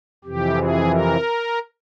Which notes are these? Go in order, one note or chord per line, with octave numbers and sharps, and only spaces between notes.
F2 C3 E3 G4
G#4
A#4